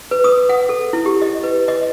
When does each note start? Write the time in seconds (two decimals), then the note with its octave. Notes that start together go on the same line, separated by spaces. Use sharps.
0.11 B4
0.24 D#6
0.49 F#5
0.69 A4
0.93 E4
1.06 G4
1.22 D#5
1.44 B4
1.68 D#5